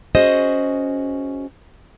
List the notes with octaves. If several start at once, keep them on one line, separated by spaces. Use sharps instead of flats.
C#4 F#4 G#4 C5 D#5